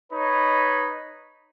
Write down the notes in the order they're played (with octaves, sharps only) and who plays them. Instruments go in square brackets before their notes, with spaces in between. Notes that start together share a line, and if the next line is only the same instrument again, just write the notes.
[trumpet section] D#4 B4 C#5 B5